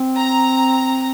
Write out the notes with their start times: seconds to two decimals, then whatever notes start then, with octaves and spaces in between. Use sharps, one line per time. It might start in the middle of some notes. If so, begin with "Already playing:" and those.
Already playing: C4
0.20 A#5